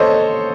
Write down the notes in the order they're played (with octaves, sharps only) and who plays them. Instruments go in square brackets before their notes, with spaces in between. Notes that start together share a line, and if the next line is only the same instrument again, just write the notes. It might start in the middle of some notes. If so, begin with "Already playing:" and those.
Already playing: [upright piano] A4 C5 C#5 D#5